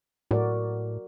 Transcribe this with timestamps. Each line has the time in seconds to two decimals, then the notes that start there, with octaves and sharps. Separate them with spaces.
0.31 A2 F#4 A#4 D5